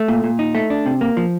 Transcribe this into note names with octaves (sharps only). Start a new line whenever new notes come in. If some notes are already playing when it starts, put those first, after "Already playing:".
Already playing: A3
A#2
A#2
D#4
A3
D4
C3
A#3
F3